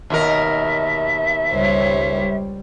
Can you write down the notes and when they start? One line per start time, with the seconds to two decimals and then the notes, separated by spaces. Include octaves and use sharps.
0.10 D#2 B2 A#4 E5
1.51 C#2 G3 C5 C#5